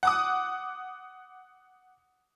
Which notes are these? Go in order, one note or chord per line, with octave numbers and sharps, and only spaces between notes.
F#5 D6 D#6